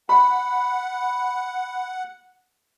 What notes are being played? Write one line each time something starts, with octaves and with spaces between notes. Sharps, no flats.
F#5 B5